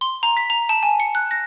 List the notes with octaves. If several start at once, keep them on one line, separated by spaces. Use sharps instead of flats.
C6
A#5
B6
A#5
A5
G#5
C#7
F#6
A#6